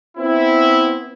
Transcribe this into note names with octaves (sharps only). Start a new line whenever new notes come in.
B3 C4 E4